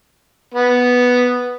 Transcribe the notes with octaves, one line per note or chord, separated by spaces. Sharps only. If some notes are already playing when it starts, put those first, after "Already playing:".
B3